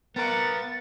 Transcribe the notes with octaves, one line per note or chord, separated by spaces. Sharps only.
B3 A#4 F#5 A#5 A6